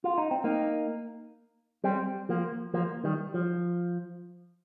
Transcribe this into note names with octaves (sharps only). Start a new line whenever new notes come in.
F4
D#4
C4
A#3 D#4
G3 C4
F3 A#3
F3 A#3
D#3 G3
F3